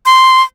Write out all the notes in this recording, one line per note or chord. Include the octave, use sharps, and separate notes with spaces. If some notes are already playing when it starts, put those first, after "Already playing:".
C6